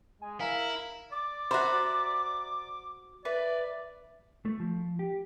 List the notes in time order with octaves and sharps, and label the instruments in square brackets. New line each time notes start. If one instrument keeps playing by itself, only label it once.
[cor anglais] G#3 [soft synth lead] G#5
[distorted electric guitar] E4 [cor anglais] A#4 [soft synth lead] F5
[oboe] D5 [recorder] D6
[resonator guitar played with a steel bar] F#4 C5 [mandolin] E5 A#5 B5
[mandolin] B4 [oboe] D5 [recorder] E5
[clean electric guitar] A3
F3
G4